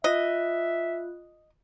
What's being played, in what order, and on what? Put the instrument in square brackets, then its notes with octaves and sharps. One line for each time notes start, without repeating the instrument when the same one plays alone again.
[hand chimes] F4 F#6 [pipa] D#5 [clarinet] E5